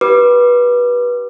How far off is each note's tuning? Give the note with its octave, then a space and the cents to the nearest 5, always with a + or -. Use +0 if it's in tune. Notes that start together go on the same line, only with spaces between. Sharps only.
G4 -30 B4 -20 D6 +15